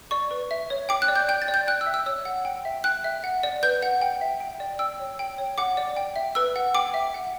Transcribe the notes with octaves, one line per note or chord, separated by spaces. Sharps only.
D5 C#6
B4
E5
C#5
G5 D6
F#6
D5
G6
G5 G6
A6
D5
G6
G5 F#6
E6
E5
E6
C#5 E6
F#5
G5
E5
G5 F#6
E5
F#5
D5
B4 G6
F#5
G5
E5
G5
D5
G5 E6
C#5
G5
C#5
F#5 D6
D5
G5
E5
B4 E6
F#5
G5 D6
E5
F#5